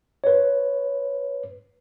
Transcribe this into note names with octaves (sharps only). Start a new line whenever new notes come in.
B4 C#5